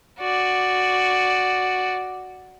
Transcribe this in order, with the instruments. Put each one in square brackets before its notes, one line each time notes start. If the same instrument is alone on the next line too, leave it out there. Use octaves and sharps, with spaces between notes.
[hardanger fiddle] F#4 D5